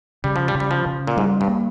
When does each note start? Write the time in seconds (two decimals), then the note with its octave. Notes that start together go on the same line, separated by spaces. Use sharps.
0.24 C#3 G3
0.36 F3
0.48 G3
0.55 C#3
0.60 G3
0.71 F3
0.86 C#3
1.07 A#2
1.17 G#2 G3
1.41 G2
1.48 A#3